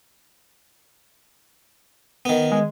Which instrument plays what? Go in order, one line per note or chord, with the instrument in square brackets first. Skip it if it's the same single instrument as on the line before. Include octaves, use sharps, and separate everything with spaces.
[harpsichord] D#3 B3
[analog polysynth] G#3